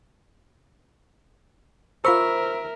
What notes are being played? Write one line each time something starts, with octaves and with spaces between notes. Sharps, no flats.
F4 A#4 C5 E5 B5 C#6 E6